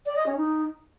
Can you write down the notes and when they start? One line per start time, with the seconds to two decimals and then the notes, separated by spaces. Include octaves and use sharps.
0.05 D5
0.16 D#5
0.26 C#4
0.36 D#4